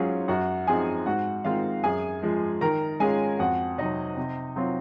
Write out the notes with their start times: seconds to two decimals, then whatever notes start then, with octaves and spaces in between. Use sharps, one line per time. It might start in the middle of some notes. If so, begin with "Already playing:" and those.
Already playing: G#2 F#3 C#4 F4 G#4
0.28 F#2 F#4 F#5
0.67 F3 C4 D#4 G#4 G#5
1.06 G#2 F#4 F#5
1.45 D#3 G#3 C4 F4 F5
1.84 F#2 G#4 G#5
2.22 F3 G#3
2.61 D#3 A#4 A#5
3.00 G#3 C#4 F4 G#4 G#5
3.39 F2 F#4 F#5
3.78 C3 F#3 D#4 D#5
4.17 C3
4.56 F#3 C4 F4